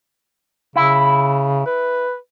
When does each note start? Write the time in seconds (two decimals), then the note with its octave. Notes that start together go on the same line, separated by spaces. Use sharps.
0.76 C#3 E4
1.66 B4